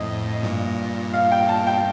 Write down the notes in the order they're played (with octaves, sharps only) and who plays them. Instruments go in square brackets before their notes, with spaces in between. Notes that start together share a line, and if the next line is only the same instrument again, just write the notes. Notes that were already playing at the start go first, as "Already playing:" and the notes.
Already playing: [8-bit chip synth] F2 A2 [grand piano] D#5
[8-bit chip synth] G2 A#2
[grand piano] F5
G5
A5
G5